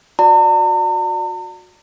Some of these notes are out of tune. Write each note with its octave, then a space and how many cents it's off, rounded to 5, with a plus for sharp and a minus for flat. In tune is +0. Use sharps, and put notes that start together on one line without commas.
F#4 -30 D5 +0 A#5 -45